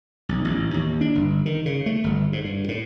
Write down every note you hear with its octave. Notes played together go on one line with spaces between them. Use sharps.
B1
A1
D#2
D4
G1
D#3
C#3
A3
G1
G#2
G2
A2